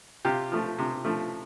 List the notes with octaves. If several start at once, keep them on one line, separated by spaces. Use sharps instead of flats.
C3 F4 G4
F3 A3
C3
F3 A3